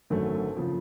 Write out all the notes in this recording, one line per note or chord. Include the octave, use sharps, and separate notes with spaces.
G#1 F#2 D3 F#3 A3
C#3 F3